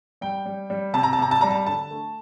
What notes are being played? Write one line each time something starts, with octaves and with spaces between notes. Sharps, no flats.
G3 G5
G3
G3
C3 A5
A#5
A5
C3 A#5
A5
G3 A#5
A5
D3 A5
A3